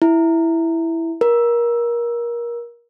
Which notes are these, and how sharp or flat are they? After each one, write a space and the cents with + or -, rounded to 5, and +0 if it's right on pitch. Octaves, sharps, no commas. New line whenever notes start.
E4 +0
A#4 +25